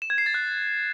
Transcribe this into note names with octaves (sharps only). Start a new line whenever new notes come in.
E7
G#6
C7
A6
F#6